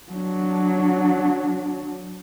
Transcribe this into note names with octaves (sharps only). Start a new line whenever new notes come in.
F#3 D4